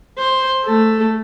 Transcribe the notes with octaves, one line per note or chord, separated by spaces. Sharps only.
C5
A3 A4